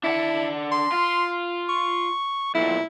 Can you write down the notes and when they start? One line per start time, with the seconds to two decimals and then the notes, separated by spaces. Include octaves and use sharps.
0.04 D4 E4 F#5
0.72 C6
0.92 F4
1.69 C#6
2.55 B1 A#2 E4